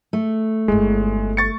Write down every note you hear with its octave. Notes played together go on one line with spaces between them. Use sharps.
A3
G1 G#3 E4
C#6 A6 C#7